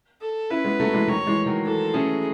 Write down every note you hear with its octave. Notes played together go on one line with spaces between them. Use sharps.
A4
C#4 E4 B4
G#3 B3
F#3 A3
E3 G#3
D#3 F#3 C#5
E3 G#3
D#3 F#3
E3 A4
A3 C#4 G#4